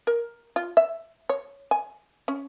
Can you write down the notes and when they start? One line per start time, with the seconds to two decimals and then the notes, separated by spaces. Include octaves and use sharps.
0.07 A#4
0.56 F4
0.77 E5
1.29 C#5
1.71 G#5
2.28 C#4